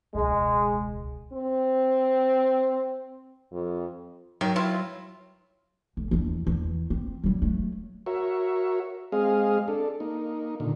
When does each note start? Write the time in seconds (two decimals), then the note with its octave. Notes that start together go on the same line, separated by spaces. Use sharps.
0.15 E1 C#2 G#3
1.33 C4
3.52 F2
4.41 D#3 F#3
4.56 E4 F4
5.97 F1
6.11 E2 D3
6.47 E2
6.90 C4
7.24 F#3 G3
7.42 F#3 A3
8.06 F#4 A#4 C#5 E5
9.12 G#3 C4 G#4 D#5 F5
9.68 D4 A4
10.00 A#3 D#4
10.60 A#2 D3 D#3